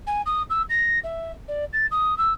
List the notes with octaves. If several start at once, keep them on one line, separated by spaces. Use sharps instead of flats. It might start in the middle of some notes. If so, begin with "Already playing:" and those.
G#5
D#6
E6
A#6
E5
D5
A6
D#6
E6